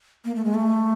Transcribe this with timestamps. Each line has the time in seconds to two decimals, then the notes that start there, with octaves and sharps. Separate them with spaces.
0.25 A#3
0.35 A3
0.44 G#3
0.54 A3